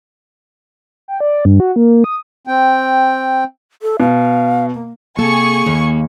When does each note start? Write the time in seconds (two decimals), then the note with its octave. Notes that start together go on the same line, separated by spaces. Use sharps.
1.08 G5
1.20 D5
1.45 G2
1.60 F#4
1.76 A#3
2.04 D#6
2.47 C4 G5
3.82 A4
4.00 B2 F5
4.75 A#3
5.19 C3 A#3 G#4 A4 G#5 C#6
5.66 D#2